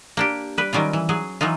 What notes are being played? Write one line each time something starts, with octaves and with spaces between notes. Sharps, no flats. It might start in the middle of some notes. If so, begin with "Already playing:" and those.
A#3 D4 G4
G3 B4
D#3 F#3 G3 C#4 F4
E3
F#3 G#4
E3 F#3 D#4 F4